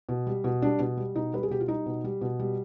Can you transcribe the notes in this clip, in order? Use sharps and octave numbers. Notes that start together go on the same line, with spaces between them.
B2
G3
B2
G3 D4
B2
G3
B2 D#4
G3 B4
G#4
B2 G4
F4
G3 D#4
B2
G3
B2
G3